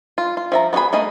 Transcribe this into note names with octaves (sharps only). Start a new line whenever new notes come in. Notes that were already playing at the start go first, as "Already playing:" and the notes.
F4
F4
F3 E5 A#5
B3 D#4 F#4 G#4 B5
A3 A#3 G#4 D#5